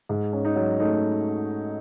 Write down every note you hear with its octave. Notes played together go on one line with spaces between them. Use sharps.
G#2
C#4
D#4
F#3
A3 D#4